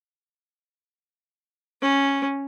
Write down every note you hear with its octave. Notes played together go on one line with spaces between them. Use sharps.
C#4